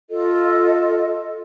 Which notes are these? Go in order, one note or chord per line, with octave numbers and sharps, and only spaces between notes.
F4 A4 D#5